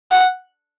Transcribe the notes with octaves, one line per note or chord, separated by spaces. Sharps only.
F#5